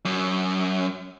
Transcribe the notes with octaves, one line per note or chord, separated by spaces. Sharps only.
F#2